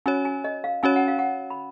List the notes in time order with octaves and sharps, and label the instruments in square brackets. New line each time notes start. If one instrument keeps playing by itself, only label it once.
[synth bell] C#4 F#4 C#5 [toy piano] G#5
[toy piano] G#5
D#5
F5
[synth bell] C#4 F#4 C#5 [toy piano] G#5
[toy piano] F#5
F5
F#5
B5